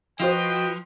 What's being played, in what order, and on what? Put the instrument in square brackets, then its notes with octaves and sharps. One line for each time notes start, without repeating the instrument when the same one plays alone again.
[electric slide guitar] F3 [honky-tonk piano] F4 F#4 C5 [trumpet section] B4 D#5 G5